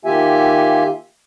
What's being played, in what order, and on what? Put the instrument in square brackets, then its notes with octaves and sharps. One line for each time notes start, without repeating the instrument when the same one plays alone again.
[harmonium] D#3 A#3 F4 G4 E5 G#5